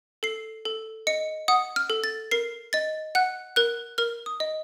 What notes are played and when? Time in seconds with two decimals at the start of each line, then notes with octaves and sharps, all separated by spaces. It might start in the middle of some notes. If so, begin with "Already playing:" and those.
0.23 A4 C7
0.65 A4
1.07 D#5 C#7
1.48 F#5 D#6
1.76 F6
1.90 A4
2.04 A6
2.31 A#4 C7
2.73 D#5 A6
3.15 F#5 F#6
3.56 A#4 F#6
3.98 A#4 F6
4.26 D#6
4.40 D#5